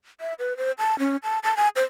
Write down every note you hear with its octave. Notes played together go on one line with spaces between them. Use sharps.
E5
B4
C5
A5
C#4
A5
A5
G#5
C5